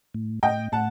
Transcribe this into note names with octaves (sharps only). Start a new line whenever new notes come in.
A2
A2 D#5 G5
A2 F#5 A5